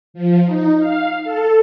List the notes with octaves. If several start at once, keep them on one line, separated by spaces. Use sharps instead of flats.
F3
D#4
F5
A4